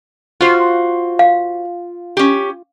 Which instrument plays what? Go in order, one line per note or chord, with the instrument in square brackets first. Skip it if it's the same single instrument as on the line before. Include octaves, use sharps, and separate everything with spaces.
[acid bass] F4 [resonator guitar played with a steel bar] F#4 C5
[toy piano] F5
[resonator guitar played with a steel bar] C#4 G4